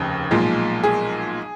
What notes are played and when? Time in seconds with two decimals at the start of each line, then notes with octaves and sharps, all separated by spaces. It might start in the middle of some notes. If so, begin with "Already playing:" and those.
Already playing: F1 D#2 C#3
0.31 B1 A#2 F3 G#3
0.84 G#4